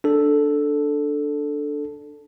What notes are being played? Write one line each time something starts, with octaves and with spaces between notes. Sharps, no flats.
D4 A4